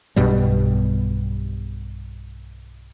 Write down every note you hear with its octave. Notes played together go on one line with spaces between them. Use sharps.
B1 G2 B2 G3